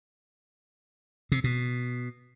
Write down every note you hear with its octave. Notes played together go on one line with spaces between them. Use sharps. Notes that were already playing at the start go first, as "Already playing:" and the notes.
C3
B2